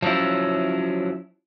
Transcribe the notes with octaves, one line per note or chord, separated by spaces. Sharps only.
F3 F#3 G#3 C#4 E4